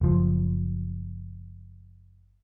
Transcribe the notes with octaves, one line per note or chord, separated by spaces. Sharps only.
F#1 F3